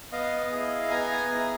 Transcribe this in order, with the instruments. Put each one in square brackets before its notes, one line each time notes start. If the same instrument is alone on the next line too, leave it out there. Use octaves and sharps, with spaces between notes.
[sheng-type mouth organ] B3 D#5 F5
E4 G#4
B3 G#5 A#5
G#4
E4